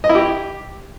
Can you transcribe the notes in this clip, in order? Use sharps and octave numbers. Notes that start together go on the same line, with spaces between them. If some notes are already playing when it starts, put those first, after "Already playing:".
D#5
E4
G4